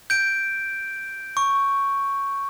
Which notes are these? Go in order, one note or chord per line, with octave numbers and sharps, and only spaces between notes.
G6 D7
C#6